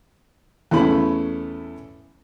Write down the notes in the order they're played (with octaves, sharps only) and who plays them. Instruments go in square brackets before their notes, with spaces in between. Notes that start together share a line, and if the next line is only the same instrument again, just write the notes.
[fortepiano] E2 A3 C#4 B5